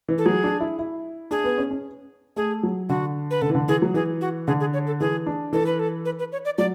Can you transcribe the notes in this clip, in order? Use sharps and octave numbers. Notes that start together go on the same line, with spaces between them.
E3
A4
F#3 G#4
D4
E4
E4
D4 G#4
B3
C#4
C#4
A3 G#4
F#3
D3 F#4
B4
D3 A4
E3
D3
E3 G#4
F#3
E3 G#4
F#4
D3 G#4
G#4
C#5
A4
E3 G#4
D4
E3 A4
B4
A4
B4
B4
C#5
D5
F#3 D5